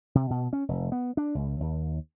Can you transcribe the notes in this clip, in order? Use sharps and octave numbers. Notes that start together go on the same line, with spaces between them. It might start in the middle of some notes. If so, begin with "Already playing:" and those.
C3
B2
C#4
F1
B3
D4
C#2
D#2